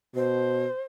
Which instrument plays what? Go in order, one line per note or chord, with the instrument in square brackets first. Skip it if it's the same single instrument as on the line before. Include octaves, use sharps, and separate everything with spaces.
[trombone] B2 [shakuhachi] C5